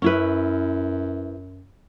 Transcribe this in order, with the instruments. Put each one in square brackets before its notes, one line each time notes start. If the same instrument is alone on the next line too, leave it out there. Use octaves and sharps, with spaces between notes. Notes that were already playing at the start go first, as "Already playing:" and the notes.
[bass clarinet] F#2 [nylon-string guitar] C#4 E4 B4